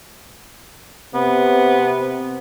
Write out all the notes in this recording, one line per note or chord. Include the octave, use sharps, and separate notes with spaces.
C3 B3